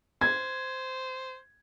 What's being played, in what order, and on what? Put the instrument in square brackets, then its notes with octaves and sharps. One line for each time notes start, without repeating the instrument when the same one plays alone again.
[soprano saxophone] C5 [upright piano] G#6